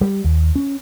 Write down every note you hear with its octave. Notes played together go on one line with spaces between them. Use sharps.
G3
D#2
C#4